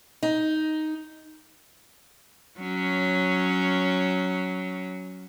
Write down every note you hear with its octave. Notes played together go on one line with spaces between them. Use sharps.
D#4
F#3 C#4